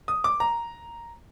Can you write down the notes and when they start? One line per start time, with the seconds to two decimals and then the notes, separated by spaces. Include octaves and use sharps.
0.08 D#6
0.24 D6
0.40 A#5